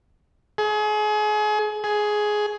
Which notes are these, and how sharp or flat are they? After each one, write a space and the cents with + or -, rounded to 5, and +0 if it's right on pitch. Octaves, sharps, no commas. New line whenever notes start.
G#4 +30
G#4 +10